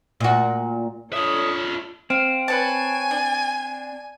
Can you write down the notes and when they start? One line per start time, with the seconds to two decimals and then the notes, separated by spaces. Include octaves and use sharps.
0.20 A#2 F#4
1.13 D4 F4 A4 C#5 E5 D#6
2.10 C4 F5
2.48 B4 C#5 G#5 A5
3.11 D4